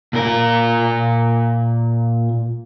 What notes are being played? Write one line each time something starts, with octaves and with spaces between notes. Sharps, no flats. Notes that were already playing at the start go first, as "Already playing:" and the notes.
A#2 A#4